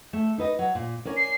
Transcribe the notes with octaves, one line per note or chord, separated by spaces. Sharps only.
A3
D#4 B4 D#5
F#3
A#2
C#4 A#4 D5
C7